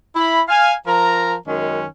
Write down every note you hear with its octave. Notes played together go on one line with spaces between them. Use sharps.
E4 B5
F5 G#5
F3 A#4 A#5
F#2 D#3 G#3 C#4